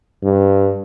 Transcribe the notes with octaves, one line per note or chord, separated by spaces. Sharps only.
G2